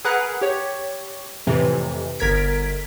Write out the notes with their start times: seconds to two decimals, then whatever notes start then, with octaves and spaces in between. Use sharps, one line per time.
0.05 G#4 A#4 B4 F#5 A#5 F#6
0.42 G4 C#5
1.47 F2 A2 C3 E3
2.19 G1 A#4 A#5 G#6 B6 D7